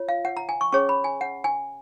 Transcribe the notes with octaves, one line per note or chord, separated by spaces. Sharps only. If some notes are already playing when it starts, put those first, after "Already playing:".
Already playing: F4 C#5
F5
F#5
A#5
G#5
C#6
C#4 G#4 C#5 C#6
B5
G#5
F#5
G#5